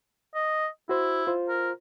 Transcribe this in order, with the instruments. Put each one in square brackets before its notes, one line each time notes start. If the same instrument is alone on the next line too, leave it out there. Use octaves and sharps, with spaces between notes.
[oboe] D#5
[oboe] E4 [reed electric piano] F#4 C5
[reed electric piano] F4 C5
[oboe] A#4